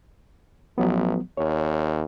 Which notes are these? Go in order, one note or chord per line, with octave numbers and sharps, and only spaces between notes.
A1 F3 F#3 B3
D#2 C#5